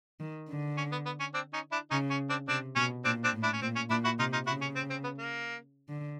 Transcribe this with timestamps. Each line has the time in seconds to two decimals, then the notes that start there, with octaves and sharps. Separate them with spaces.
0.20 D#3
0.49 D3
0.77 C#4
0.92 B3
1.06 B3
1.20 C#4
1.34 C4 D4
1.53 C#4 D#4
1.72 D4 E4
1.91 C#3 C#4 D#4
2.10 C#4
2.29 C4 D4
2.48 C3 C4 D4
2.76 B2 C#4
3.05 A#2 C4 D4
3.24 C4 D4
3.33 A2
3.43 D4 E4
3.53 C#4
3.61 A#2 C4
3.76 C#4
3.90 A#2 D4 E4
4.04 E4 F#4
4.19 C3 D#4 F4
4.33 D#4 F4
4.47 C#3 E4 F#4
4.61 C#4
4.76 C4
4.90 C4
5.04 B3
5.18 A#3
5.89 D3